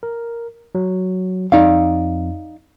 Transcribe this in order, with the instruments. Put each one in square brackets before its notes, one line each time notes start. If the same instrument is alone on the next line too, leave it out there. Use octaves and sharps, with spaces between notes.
[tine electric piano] A#4
F#3
[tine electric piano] F2 [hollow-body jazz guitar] D#4 D5 F5